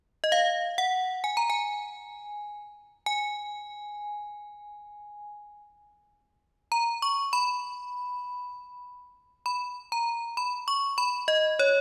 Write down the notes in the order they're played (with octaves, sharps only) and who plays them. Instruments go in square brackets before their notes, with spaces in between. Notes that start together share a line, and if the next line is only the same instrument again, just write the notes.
[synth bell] D#5
F5
F#5
G#5
A#5
G#5
G#5
A#5
C#6
B5
B5
A#5
B5
C#6
B5
D#5
C#5